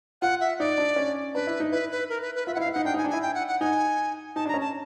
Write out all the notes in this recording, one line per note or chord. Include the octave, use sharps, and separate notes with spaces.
F4 F#5
E5
D#4 D5
D4
C#4
D4 B4
E4
D#4
E4 B4
B4
A#4
B4
B4
F4 E5
E4 F#5
F5
E4
D#4 F#5
D4 G5
D#4
G#5
D4
E4 G#5
G5
F#5
F#5
D#4 G#5
D#4 A5
D4 A#5
C#4
A5